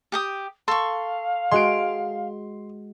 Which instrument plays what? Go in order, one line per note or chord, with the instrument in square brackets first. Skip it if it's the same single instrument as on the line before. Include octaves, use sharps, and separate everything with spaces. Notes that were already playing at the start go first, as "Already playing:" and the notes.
[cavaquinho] G4 G5 D#6
[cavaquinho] A4 C#6 [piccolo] F5 [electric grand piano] C6
[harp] G#3 F#4 D7 [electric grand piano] C6